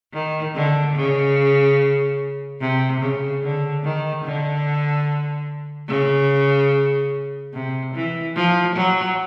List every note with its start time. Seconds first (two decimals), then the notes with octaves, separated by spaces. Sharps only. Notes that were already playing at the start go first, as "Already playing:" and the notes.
0.14 D#3
0.55 D3
0.96 C#3
2.61 C3
3.01 C#3
3.43 D3
3.84 D#3
4.25 D3
5.89 C#3
7.54 C3
7.95 E3
8.36 F3
8.76 F#3